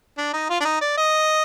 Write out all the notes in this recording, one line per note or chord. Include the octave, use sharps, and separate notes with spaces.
D4
D#4
F4
D4
D#4
D5
D#5